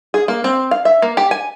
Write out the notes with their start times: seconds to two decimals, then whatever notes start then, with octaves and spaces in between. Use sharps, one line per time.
0.14 G#4
0.28 A#3
0.44 C4
0.71 F5
0.85 E5
1.02 A#3
1.17 G4
1.31 G#5